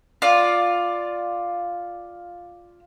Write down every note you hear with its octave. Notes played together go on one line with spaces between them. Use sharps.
F4 D5